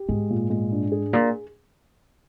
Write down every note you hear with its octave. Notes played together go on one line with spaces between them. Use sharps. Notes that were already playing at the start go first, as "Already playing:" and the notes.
Already playing: G4
G#2 G#3
A#2
G#3
D4
G#4
A#2